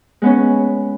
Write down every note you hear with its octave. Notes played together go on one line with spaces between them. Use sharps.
G#3 B3 C#4